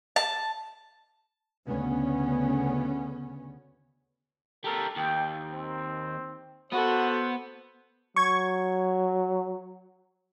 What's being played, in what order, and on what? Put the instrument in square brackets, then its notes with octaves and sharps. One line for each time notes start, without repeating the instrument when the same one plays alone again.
[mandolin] A5
[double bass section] D2 C#3 B3 C#4
[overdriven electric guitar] G3 A#4 [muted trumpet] A4
[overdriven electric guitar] D#2 [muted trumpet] G5
[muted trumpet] C4
[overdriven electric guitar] B3 [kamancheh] F#4 A4 [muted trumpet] C5
[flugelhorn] F#3 [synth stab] C#6 G#6